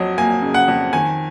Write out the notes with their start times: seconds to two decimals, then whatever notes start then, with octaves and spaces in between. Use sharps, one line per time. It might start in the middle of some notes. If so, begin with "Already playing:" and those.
Already playing: F2 F#3 D#5
0.18 A#3 G#5
0.42 C#3
0.54 F#5
0.68 F2
0.93 D#3 G#5